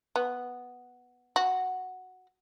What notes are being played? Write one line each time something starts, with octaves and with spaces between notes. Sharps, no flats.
B3
F#4